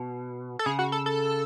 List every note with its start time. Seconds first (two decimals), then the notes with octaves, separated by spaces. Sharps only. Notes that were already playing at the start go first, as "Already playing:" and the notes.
Already playing: B2
0.59 A4
0.66 C#3 G#4
0.79 F#4
0.92 A4
1.06 A4